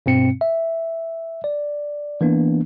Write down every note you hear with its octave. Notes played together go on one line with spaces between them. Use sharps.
G2 B2 C4 C#7
E5
D5
E3 A#3 B3 D4